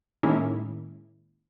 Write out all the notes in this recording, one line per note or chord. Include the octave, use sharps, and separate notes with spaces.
A2 D#3 G#3 A#3 C#4 E4